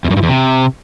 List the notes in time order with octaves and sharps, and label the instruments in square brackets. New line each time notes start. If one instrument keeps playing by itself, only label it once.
[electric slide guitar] E2
F#2
G2
E2
C3